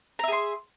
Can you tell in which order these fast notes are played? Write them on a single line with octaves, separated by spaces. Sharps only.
A#5 E5 G#4 C6